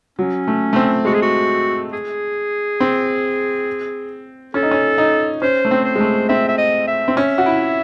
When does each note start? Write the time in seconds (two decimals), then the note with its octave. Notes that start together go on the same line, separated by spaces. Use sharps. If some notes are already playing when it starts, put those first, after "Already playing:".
0.19 F#3 C#4
0.48 A3
0.73 A3
0.76 C4
1.05 G#3 F#4
1.14 G#4
1.22 F#4
1.93 G#4
2.80 C4
4.54 C#4 A4
4.63 D#4
4.71 C#4
4.98 D#4
5.42 C#4 C5
5.65 A3
5.71 C4
5.85 C5
5.95 G#3
6.00 A3
6.29 C4 E5
6.48 E5
6.58 D#5
6.87 E5
7.08 C4
7.17 C#4 E5
7.38 F#4
7.46 E4